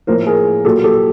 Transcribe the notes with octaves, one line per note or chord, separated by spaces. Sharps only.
A2 F3 A#3 A#4 C5
G#4 A#4
A#2 F#3 A#3 G4 A4
G4 A4